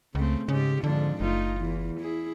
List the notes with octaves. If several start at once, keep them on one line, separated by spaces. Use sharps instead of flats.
C#2 C#3 A3 C4
G#2 C#3 G#3 G4
F2 G#2 D3 D4
F#1 A3 D#4 F4
E2 E3
E4 G#4